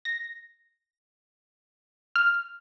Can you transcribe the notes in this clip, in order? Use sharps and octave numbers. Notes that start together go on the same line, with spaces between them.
A#6
F6